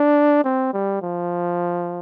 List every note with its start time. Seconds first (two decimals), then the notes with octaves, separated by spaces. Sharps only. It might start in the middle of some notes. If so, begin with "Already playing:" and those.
Already playing: D4
0.44 C4
0.73 G3
1.02 F3